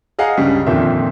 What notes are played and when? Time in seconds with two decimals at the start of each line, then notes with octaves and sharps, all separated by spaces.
0.19 G#4 D#5 F5 F#5 A#5
0.37 C#2 G2 C#3 G3
0.66 F2 A#2 D3 D#3 C4 E5